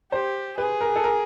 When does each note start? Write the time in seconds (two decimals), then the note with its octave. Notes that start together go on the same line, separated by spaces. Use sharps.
0.12 G4 C5
0.58 G#4 B4
0.81 A#4
0.96 A4
1.04 A#4